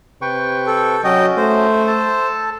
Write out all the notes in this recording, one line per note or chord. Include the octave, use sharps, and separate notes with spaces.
C3 B4 G5 C#6
A4
F#3 C#4 F#4 D#5 G5
A3 C5
A4 A5